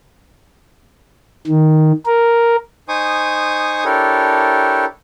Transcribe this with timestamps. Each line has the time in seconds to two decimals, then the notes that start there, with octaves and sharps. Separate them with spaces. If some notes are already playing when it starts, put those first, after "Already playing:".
1.47 D#3
2.06 A#4
2.89 D#4 C5 G#5 C#6 D#6
3.85 D4 E4 G4 A4 A#4 C#5